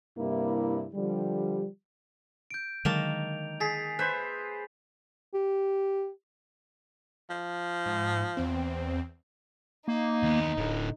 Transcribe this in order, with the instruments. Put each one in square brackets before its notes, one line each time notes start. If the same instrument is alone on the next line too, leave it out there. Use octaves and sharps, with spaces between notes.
[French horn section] G2 C3 A#3 E4
D3 F3 G3
[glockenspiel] G6 D7
[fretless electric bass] D3 F#3 G#3 [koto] D#3 A#3 A5 [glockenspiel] F7
[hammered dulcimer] G#4 [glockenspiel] A6 B6 C7
[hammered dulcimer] B4 C5 [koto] E5
[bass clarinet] G4
[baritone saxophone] F3
[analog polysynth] G#2
E2 C4
[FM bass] A#3 [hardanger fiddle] D#4
[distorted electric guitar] D#2 B3
[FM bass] D1 [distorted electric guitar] A2 D3